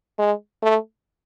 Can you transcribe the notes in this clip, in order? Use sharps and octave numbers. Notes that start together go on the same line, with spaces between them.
G#3
A3